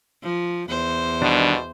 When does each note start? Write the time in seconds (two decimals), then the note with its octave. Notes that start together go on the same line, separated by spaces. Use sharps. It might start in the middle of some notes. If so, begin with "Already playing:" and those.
0.23 F3
0.69 E2 C5
1.22 B2 D#3 G3 D4